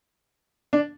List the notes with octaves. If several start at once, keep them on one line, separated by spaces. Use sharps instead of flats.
D4